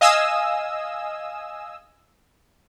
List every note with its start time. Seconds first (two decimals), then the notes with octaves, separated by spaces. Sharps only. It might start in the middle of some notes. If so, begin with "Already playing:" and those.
0.01 D#5 F5 G#5 D#6 E6